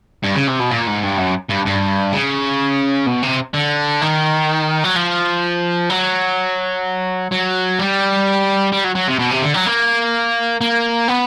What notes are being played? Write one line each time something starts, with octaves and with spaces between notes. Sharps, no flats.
G2
C#3
C3
B2
A#2
G#2
G2
F#2
G2
G2
C#3
B2
C3
D3
D#3
F#3
F3
F#3
F#3
G3
G3
F#3
F#3
C3
B2
C3
D3
F#3
A#3
A#3
B3